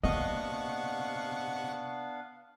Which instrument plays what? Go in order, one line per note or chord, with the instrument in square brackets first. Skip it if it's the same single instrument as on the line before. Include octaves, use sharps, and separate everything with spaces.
[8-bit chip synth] C3 F#5 C#6 [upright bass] A#3 [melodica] B3 D4 F5 [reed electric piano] D#5